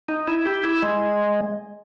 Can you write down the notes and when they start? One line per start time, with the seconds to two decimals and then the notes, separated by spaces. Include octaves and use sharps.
0.08 D#4
0.27 E4
0.45 G4
0.63 E4
0.82 G#3